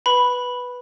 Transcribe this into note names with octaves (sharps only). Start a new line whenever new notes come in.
B4 B5